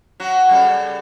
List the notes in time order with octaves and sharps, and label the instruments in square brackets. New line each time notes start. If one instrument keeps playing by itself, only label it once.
[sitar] F#3 F#4
C#3 G3 A4